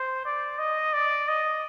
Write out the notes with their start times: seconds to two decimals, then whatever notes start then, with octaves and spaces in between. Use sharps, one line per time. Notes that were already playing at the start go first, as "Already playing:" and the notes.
Already playing: C5
0.26 D5
0.59 D#5
0.93 D5
1.28 D#5